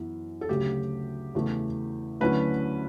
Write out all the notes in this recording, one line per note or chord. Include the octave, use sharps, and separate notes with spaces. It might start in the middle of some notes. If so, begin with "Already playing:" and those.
Already playing: F#2 E3 B3
A4
D2 C#3 F#3 G4
E2 C#3 E3 A3
D2 D3 F#3 C#4 E4 B4